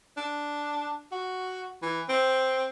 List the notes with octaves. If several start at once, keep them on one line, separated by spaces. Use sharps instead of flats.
D4
F#4
E3
C4